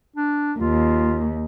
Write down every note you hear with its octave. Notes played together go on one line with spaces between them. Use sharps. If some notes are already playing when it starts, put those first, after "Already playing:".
D4
D#2 F4